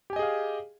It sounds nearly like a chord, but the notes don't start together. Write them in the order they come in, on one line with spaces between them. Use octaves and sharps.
G4 G#5 D#5 G#4 F5